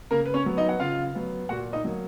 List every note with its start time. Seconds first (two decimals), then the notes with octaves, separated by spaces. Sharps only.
0.11 C#3 A#3 A#4
0.26 B4
0.34 C#4 C#5
0.46 F#3 B3
0.57 D#4 D#5
0.69 F#5
0.80 C#3 F4 F5
1.15 F#3 B3
1.49 A#2 F#4 F#5
1.73 D#4 D#5
1.85 F#3 A#3